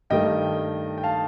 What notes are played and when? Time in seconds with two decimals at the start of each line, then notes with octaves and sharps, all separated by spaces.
0.10 G2 D#3 A3 D#5 G5
0.98 G5
1.03 F5 A5